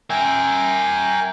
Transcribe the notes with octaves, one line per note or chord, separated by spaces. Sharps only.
A#4 E5 G5 G#5